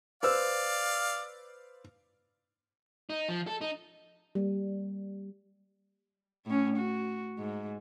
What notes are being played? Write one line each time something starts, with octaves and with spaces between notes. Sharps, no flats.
B4 C5 D5 F5 E6
D#4
F3
A4
D#4
G3 A#3
A2 C#4
F#4
G#2